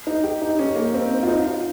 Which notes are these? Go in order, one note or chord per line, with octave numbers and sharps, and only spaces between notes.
D#4
G4
D#4
C#4
A#3
C4
F4
D#4
F4